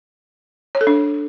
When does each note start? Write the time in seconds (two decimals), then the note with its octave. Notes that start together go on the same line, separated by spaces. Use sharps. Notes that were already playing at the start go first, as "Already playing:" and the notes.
0.75 C#5
0.81 A4
0.87 D4